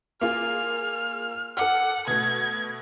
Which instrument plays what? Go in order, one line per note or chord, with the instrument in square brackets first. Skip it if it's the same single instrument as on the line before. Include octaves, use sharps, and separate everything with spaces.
[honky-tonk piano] A#3 F4 G#4 [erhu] F6
[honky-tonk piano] A4 D6 F6 [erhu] F#5
[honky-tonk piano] B2 A3 [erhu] G#6